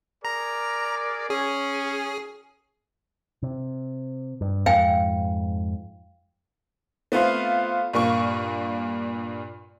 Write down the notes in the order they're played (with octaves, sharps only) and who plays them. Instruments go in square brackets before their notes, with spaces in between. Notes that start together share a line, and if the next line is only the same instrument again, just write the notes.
[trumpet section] G#4 A#4 D5 [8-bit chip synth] A#5
[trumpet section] C#4 [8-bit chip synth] G#4
[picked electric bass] C3
G2
[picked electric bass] F2 G#2 [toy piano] F5 G5 G#5
[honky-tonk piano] A3 B3 C4 F4 C5 F5
G2 A#2 A#3 C#6